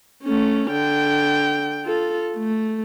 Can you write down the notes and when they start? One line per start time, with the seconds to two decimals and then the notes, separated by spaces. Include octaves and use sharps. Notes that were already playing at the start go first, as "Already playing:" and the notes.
0.23 A3 C#4
0.71 D3 G5
1.84 F4 A4
2.37 A3